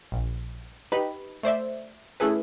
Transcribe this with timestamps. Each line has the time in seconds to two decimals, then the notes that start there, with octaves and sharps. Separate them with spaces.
0.12 A#1
0.92 D#4 G4 B4 D#5 B5
1.43 A3 C5 D5 E5
2.20 A3 C#4 E4 G#4 A4 B4